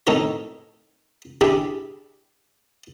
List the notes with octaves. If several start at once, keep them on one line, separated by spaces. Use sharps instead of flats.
F2 A2 D#4 A4 A#4 C#5
D4 E4 G4 G#4 G#5 B5